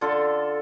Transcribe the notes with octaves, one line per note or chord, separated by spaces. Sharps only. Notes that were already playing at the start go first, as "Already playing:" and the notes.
D3 F4 A4